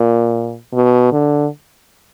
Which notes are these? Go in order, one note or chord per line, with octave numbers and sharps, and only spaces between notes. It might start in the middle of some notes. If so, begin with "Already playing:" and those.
Already playing: A#2
B2
D3